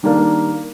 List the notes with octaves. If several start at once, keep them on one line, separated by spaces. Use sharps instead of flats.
D#3 G3 A#3 D4